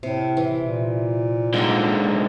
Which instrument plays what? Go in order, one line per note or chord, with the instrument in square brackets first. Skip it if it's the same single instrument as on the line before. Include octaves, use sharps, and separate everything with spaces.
[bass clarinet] A2 [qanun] C3
[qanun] E3
[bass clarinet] A#2
[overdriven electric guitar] G#2 D3 [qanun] A#3 D#5 G5